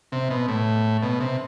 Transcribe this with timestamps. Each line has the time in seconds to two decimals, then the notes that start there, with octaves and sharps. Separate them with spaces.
0.12 C3
0.30 B2
0.48 A2
1.03 B2
1.20 C3